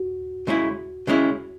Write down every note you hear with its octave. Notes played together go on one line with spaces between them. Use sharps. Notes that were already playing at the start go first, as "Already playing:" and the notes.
Already playing: F#4
C#3 G#3 C#4 E4
C#3 G#3 C#4 E4